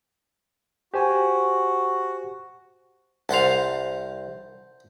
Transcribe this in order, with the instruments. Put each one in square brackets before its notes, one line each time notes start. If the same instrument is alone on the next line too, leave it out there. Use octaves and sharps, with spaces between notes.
[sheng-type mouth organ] F#4 [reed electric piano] G4 C5 G#5
[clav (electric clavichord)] C2 F5 [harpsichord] C5 F#5 A5